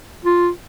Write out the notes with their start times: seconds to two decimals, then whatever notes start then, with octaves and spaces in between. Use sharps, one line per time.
0.24 F4